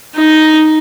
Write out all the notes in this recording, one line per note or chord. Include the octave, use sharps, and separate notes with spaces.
D#4